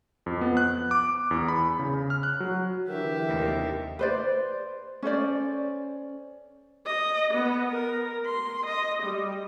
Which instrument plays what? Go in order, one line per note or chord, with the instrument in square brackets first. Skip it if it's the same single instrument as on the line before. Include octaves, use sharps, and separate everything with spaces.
[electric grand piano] F2
B3
F#6
D6
E2
B5
C#3
F6
F#6
F#3
[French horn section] D3 E3 [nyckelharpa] G4 E5 [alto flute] A#4
[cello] D#2 C3
[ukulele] B4 C5 D5
C#4 A4 C5 D5
[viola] D#5
B3
A#4
C6
D#5
G3